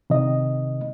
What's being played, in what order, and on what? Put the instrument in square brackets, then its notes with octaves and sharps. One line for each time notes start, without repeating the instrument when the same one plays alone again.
[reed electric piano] C3 D#3 D#5